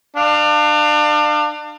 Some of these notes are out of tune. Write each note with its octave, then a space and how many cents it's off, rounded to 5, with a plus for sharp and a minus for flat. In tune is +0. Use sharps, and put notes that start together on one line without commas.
D4 +30 F5 +0